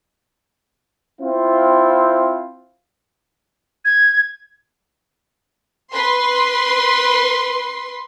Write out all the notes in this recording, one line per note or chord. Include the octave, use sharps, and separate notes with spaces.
C4 E4 F4
G#6
B4 C6